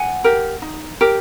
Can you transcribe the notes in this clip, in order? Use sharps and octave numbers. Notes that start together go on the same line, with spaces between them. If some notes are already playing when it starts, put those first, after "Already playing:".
Already playing: F#5 G#5
G4 A#4
D#4
G4 A#4